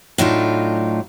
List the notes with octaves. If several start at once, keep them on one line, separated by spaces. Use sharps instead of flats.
A2 F#3 D4 D#4 F4